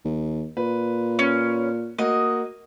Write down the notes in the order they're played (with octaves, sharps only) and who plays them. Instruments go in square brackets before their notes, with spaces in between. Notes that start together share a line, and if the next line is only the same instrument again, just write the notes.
[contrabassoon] D#2
[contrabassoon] A#2 [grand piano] B4
[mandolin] C#4
[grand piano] A#3 F#4 [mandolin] D#5